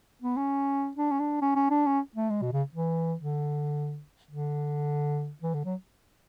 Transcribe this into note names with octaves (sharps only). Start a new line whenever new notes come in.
B3
C#4
D4
C#4
D4
C#4
C#4
D4
C#4
A3
G#3
B2
C#3
E3
D3
D3
E3
D3
F#3